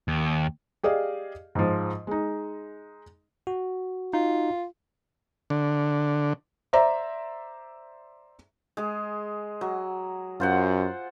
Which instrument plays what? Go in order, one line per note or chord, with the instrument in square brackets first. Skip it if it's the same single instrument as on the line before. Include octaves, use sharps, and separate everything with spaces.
[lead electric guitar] D#2
[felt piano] G4 G#4 D5 D#5 F5
G#2 F3
G#3 D#4
[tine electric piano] F#4
[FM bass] D#4 [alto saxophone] F4
[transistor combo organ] D3
[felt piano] C5 D5 E5 A#5
[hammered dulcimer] G#3 G#4
F#3
[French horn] F#2 [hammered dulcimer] F4 C5 F#5